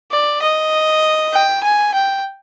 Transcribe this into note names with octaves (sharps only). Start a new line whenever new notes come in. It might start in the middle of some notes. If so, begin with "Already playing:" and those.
D5
D#5
G5
G#5
G5